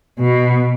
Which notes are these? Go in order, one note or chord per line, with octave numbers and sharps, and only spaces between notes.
B2